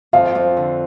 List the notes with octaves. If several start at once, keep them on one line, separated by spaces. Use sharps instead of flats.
F2 F5
F2
D3